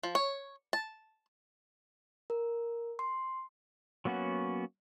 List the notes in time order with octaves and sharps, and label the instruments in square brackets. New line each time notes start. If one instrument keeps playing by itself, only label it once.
[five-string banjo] F3
C#5
A5
[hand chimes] A#4
C6
[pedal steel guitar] F#3 A#3 B3 C#4 F#4